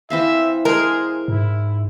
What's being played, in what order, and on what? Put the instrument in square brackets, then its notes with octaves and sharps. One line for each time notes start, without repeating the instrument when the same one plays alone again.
[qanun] E3 C4 F5 [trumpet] E5
[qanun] G#3 C5 [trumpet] G#4 [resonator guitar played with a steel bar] A#4
[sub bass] G#2 [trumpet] E4